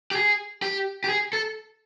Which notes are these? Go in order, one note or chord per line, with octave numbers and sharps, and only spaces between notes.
G4
G#4
G4
G4
G#4
A4